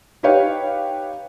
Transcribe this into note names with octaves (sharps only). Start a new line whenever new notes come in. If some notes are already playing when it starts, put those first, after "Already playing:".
D#4 G4 B4 C#5 F5 G5